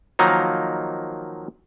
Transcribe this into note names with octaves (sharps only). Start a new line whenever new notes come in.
D#3 F3 F#3 A#3 D#4